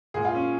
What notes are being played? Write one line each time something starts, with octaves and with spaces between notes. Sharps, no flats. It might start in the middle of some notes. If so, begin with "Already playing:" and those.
A#2 G#3 G#4
F4
C#4